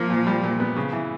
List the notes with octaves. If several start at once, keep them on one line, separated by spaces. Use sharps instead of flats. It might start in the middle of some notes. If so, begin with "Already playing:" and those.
Already playing: F3 A#3
A#2
G3
A#2
B3
C#3
E3